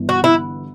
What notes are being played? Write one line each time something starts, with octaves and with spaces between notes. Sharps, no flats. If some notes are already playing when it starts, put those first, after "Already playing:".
Already playing: G1 G2 E3
F#4
E4